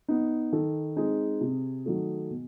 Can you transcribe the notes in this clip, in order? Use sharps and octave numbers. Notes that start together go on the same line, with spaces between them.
B3 D#4
D#3 A4
G#3 C4 D#4 G#4
C3
D#3 F#3 A3
B2